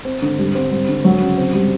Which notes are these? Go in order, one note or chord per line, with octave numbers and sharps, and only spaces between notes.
C4
D3
G3
C4
G3
D3
F#3
C#3
C4
G3